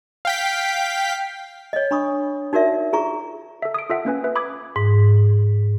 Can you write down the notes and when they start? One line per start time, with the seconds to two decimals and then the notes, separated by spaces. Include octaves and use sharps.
0.25 F5 G5 B6
1.73 C#5 D#5
1.91 D4 B5 C#6 D#6
2.53 D#4 F#4 A#4 D5 E5
2.93 F4 G#4 A#5 C#6
3.62 A4 E5
3.74 D#6 D7
3.90 F4 A4 E5 F#5
4.05 A#3 C#4 B4 G#5
4.24 B4 E5
4.36 B5 D6 D#6 G#6
4.76 G#2